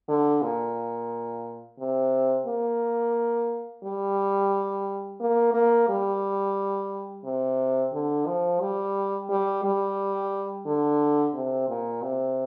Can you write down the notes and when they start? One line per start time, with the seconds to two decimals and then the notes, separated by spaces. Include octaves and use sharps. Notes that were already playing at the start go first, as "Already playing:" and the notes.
0.09 D3
0.42 A#2
1.79 C3
2.46 A#3
3.83 G3
5.20 A#3
5.54 A#3
5.89 G3
7.25 C3
7.93 D3
8.27 F3
8.61 G3
9.29 G3
9.64 G3
10.66 D3
11.34 C3
11.69 A#2
12.02 C3